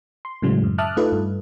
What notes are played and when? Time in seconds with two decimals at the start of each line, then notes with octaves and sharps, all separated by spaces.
0.25 C6
0.42 A2 C#3 F#3 G#3
0.63 F#2
0.78 E5 A5 D6 D#6 F6 F#6
0.97 A3 D#4 F4 A4 B4
1.12 G2